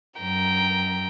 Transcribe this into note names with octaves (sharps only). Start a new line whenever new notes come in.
F#2 G5 A#5